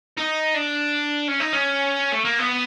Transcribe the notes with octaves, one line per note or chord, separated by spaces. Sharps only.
D#4
D4
C#4
D#4
C#4
A3
A#3
B3